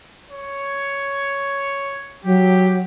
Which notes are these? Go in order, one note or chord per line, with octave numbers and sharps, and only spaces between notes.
C#5
F#3 G4